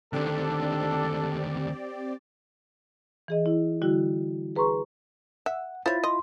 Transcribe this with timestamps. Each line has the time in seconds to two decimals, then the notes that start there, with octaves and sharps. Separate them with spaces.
0.13 D2 D#3 C4 D4 G4 A4 D5
3.28 E3 G#4 D#5
3.46 E4
3.82 D3 G3 E4 F#4
4.56 G#4 B4 A#5 C6 C#6
5.46 E5 F#5
5.86 E4 F4 C5 C#5 B5 A6
6.04 D#5 C6